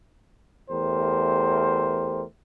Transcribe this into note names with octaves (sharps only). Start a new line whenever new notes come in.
E2 A3 G4 A#4 C5